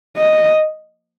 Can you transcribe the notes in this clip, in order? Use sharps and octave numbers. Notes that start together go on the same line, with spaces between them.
D#5